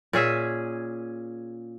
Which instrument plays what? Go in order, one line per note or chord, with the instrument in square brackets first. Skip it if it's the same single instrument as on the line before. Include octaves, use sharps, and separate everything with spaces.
[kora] A#2 C#4 G#4 E5